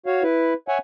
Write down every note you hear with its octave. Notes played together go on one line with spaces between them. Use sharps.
F#4 C#5 F5
E4 B4
C#5 E5 F#5 G#5